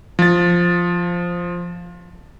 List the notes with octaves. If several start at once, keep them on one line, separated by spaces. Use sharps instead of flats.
F3 A6